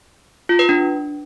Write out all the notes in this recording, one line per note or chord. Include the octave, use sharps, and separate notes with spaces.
F4
B4
D4